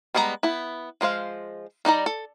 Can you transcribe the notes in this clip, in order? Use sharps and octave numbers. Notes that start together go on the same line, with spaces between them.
G3 G#3 B3 D4 A#5
B3 E4
F3 G#3 C5 F5
G3 D#4 D5 A#5
A4